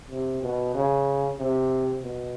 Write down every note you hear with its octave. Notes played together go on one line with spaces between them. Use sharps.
C3
B2
C#3
C3
B2